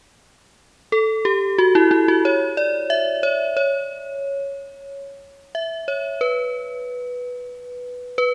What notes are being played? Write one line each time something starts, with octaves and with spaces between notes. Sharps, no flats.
A4
G4
F#4
E4
E4
F#4
C#5
D5
E5
C#5
C#5
E5
C#5
B4
B4